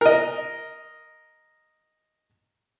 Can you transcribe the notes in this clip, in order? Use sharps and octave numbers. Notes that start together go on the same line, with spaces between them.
A#4 D#5